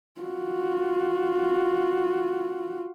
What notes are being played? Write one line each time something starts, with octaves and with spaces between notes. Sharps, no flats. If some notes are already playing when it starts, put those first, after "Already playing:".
F4 F#4